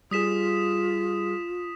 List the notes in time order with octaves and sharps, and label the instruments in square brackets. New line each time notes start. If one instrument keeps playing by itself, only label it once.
[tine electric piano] G3 G#4 [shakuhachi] F4 [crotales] D#6 B6 E7